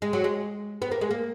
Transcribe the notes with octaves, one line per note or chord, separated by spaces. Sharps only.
G#3
F#3
G#3
B3
A#3
G#3
A#3